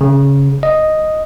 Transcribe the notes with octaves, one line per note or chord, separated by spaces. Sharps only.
C#3
D#5